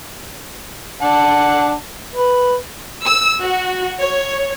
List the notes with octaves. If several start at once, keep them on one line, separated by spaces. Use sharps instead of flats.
D4 F#5 A5
B4
E6
F#4
C#5